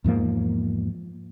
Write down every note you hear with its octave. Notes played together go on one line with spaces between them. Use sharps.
E2 G#2 F3 A#3